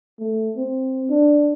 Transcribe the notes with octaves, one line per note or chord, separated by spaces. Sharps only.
A3
C4
D4